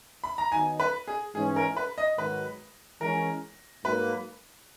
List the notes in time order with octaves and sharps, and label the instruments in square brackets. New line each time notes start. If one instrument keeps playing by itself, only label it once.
[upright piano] B5
A#5
[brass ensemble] D#3 F#3 B3 D#4 [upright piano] G#5
[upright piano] B4
G#4
[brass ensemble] G#2 E3 G#3 C#4 [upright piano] G#4
[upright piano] A#4
B4
D#5
[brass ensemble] G#2 D#3 F#3 [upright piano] B4
[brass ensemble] E3 G#3 C#4 [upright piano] A#4
[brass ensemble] G#2 F#3 A#3 [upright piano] B4